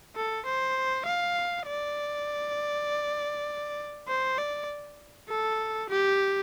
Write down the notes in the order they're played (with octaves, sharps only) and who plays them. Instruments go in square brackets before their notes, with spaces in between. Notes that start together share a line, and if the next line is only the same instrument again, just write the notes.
[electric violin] A4
C5
F5
D5
C5
D5
A4
G4